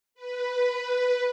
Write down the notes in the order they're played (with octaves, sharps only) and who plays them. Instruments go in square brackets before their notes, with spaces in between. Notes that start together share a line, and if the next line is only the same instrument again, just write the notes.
[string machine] B4